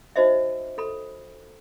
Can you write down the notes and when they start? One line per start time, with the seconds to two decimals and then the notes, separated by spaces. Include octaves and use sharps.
0.16 D#4 F#4 C5 D#5 E5
0.78 A4 B5